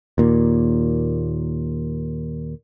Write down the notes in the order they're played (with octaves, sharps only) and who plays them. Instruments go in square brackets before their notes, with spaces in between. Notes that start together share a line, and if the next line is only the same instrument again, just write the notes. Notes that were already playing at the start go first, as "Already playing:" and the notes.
[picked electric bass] D#2 A#2